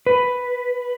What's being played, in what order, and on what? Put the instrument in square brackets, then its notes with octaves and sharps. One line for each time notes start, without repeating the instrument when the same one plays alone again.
[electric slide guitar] B4